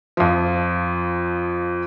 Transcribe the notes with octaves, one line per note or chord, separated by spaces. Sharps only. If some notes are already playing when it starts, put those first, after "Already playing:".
F2 F3